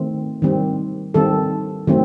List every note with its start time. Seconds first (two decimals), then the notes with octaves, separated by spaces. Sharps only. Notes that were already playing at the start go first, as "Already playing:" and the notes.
Already playing: D#3 A3 C4
0.42 D#3 G3 C4
1.14 D#3 G3 C4 A4
1.87 D#3 F#3 A3 C4